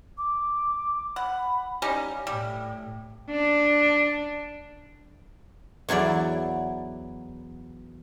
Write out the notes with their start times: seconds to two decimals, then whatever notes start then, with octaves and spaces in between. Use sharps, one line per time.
0.17 D6
1.16 F#5 B5
1.82 G3 C#4 D#4 F5
2.27 A2 G3 G5
3.30 D4
5.89 E2 F#3 E4 D5